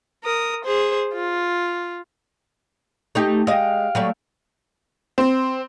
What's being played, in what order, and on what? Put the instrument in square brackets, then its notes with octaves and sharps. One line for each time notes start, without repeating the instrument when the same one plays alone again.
[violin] A#4 D#6
G#4 C5
F4
[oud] A3 D#4 G4
[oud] G#3 D#5 [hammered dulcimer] F5 G5
[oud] F#3 G3 A3
[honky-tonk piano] C4